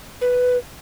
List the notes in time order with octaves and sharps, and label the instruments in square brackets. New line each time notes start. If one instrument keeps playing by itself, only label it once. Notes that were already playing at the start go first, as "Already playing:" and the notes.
[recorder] B4